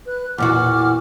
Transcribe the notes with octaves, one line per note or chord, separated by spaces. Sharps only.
B4 F#6
E2 A#2 F#4 F#5 D6 F6